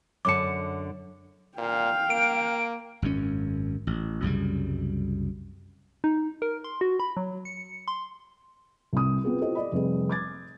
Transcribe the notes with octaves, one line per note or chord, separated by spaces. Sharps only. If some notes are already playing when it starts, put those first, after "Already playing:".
F#2 D3 A5 D6 C#7
A#2 F5 G5
A#3 D7
G#1 F#2 C#3 C#4
A1
C2 F#2 C#3 G3
D#4
A#4
C6
F#4
B5
F#3
C#7
C6
C2 C3 D#6
B3 C4 F4 G#4 B4
E4 F4 G4 A4 C5 D#5
D5 D#5 B5
F1 C3 G3 C4 G#4
D6 G#6 A6